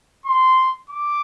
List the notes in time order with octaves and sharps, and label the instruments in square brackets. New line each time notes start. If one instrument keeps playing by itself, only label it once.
[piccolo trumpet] C6
D6